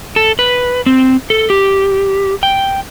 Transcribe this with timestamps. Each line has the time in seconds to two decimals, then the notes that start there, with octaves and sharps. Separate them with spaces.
0.16 A4
0.39 B4
0.86 C4
1.30 A4
1.50 G4
2.43 G5